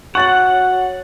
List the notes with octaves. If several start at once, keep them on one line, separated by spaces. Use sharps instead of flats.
F#4 C#5 F#5 C#6 A6 F#7